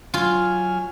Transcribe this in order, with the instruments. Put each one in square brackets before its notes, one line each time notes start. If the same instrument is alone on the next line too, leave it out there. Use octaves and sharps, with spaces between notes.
[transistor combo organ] F#3 G#5 F6 [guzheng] F4